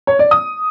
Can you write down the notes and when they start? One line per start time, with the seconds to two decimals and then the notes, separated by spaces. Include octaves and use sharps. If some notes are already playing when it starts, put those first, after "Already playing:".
0.07 C#5
0.19 D5
0.31 D#6